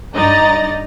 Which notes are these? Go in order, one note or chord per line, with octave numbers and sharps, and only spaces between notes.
G2 D#4 D5 D#5 A#5 A6